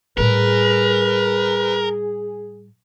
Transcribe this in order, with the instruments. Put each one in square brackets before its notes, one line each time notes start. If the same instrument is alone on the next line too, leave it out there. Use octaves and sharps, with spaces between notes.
[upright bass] A2 G3 [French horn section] G#4 [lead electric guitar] A#4 [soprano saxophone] B4